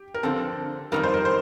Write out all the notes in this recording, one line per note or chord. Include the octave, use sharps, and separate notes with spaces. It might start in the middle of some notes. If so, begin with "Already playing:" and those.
Already playing: G4
A#4
D3 F3 C4 A4
F2 C3 D#3 G3 A#4
C5
A#4
C5